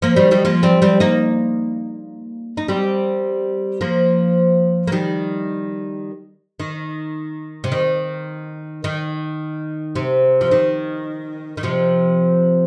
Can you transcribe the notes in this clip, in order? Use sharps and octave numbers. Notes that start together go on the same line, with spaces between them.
F3 A#3
D#3 G3
D#3 G3
F3 A#3
G3 C4
G3 C4
A#3 D#4
D#4
G3 C4
F3 A#3
A#3
D#3 G3
D#3
C3
D#3
D#3
C3
F3
D#3
D#3
C3 F3